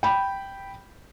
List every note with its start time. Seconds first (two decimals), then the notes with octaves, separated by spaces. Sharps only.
0.03 G5 B5